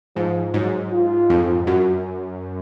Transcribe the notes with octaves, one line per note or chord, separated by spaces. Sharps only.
G#2 F3
G#2 F#3
F4
F2
F#2 F#4